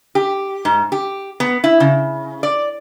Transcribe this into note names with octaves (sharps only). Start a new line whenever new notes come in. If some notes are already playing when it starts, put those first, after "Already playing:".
G4
G#2
G4
B3
E4
C#3
D5